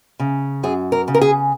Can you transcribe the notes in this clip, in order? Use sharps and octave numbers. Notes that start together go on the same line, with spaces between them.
C#3
F#2 G#4
A#4
C#3
A#4
G#4